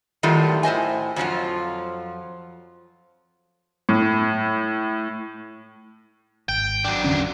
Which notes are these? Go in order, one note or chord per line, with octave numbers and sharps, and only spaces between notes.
A2 D#3 F#3 G3 A3 F4
A2 C5 D#5 G#5
F2 F3 F#3 F4
A2
G#1 G5
F#3 D4
E2 D3 C#4